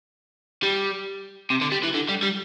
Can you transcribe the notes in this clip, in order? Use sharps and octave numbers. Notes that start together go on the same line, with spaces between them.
G3
C3
D3
G3
E3
D3
G3
G3